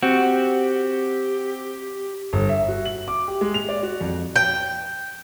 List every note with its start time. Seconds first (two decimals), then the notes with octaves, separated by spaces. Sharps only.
0.03 C4 F#4 G4
2.33 G1
2.49 E5
2.68 F#4
2.85 F#7
3.08 D6
3.28 G4
3.41 G#3
3.54 F7
3.69 D5
3.83 F#4
4.01 F2
4.36 G5